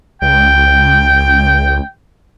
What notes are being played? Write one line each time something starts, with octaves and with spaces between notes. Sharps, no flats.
C#2 G5